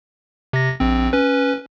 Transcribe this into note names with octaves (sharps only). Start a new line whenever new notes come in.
C3 A#6
A#1 C4
C#4 B4